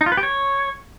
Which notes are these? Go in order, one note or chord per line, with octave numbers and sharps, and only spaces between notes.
D#4
F4
B4
G4
C#5